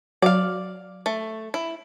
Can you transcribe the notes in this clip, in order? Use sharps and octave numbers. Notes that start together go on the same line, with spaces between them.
F#3 D5 F5
A3
E4